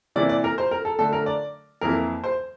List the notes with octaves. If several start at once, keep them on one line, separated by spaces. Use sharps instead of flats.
C3 E3 A#3 E4 D5
D5
A#4
C5
A#4
A4
D3 A3 D4 A4
A#4
D5
F2 E3 A#3 E4 A#4
C5